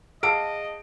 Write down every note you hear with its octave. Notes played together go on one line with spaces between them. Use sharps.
G#4 D#5 F5 F#5 A5 E6 D7